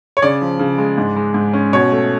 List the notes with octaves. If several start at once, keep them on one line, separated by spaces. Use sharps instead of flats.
C#5
C#3 D5
F3
C#3
G#3
G#2
G#3
G#2
C#4
B2 C#5
A3